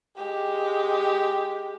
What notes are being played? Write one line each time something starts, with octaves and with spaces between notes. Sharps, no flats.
G#3 G4